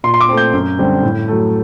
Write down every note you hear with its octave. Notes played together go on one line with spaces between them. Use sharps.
A#2 C6
C6
D6
A3 C4
G6
F#2
D3 G3 C4
A2
F#3 A3